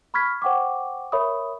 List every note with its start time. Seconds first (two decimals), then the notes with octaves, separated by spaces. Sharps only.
0.14 B5 C#6 F6 G#6 B6
0.42 C5 F#5 G5 C#6 D6
1.12 A#4 C#5 E5 B5 C#6 D#6